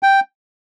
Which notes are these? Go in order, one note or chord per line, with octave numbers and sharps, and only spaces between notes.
G5